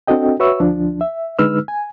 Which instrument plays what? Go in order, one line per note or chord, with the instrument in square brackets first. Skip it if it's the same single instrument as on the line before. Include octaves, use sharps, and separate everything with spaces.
[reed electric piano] C4 D4 F#4 A4 D#5 G5
F#4 B4 C#5 E5 C#6 E6
D2 F3 D4
E5
D3 G#3 D#4 B4 E6 F6
G#5